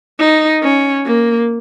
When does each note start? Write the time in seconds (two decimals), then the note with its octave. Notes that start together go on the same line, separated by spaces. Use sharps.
0.19 D#4
0.63 C#4
1.06 A#3